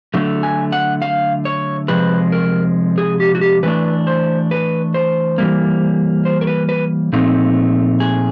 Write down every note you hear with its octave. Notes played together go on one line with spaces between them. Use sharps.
D3 F#3 A3
G#5
F#5
F5
C#5
C3 F3 G#3 B4
A#4
G#4
G4
F#4
G4
E3 A3 D4 B4
C5
B4
C5
E3 G3 A#3
C5
A#4
B4
B4
A#2 F3 A3 C4 D#4
G#4